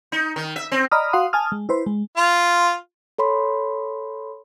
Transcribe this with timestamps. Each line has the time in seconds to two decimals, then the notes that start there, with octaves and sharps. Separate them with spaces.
0.12 D#4
0.36 D#3
0.56 E5
0.72 C4
0.91 D5 D#5 A#5 B5 D#6 F6
1.13 F#4 F5 F#5 C6 D#6
1.33 G#5 A5 D#6 F6
1.52 G#3
1.69 E4 B4 C5
1.86 G#3
2.17 F4
3.18 A4 C#5 B5 C6